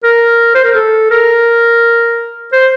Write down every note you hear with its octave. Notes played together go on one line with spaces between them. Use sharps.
A#4
C5
A#4
A4
A#4
C5